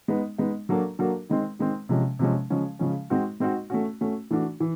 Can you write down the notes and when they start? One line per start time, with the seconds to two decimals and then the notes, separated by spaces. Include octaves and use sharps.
0.08 G#3 B3 D#4
0.38 G#3 B3 D#4
0.69 F#3 A#3 D4 F#4 A4
0.99 F#3 A#3 D4 F#4 A4
1.29 D#3 G#3 C4
1.59 D#3 G#3 C4
1.89 C3 F3 G#3 C#4
2.19 C3 F3 G#3 C#4
2.50 C#3 F3 G#3 C#4
2.79 C#3 F3 G#3 C#4
3.10 G#3 C4 D#4 F#4
3.40 G#3 C4 D#4 F#4
3.70 A3 C#4 F#4
4.01 A3 C#4 F#4
4.31 E3 A3 D4 F#4
4.60 E3